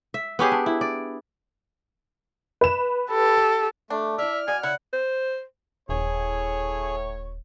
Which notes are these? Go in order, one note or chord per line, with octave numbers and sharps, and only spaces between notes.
E5
B3 C#4 G4 G#4
D4
E4
D5
B4 E7
G4 A4
A3 D4
E4 D5 E5 F6
B2 D5 G#5
C#3 E4 F#5
C5
D#1 A2 G#4 C#5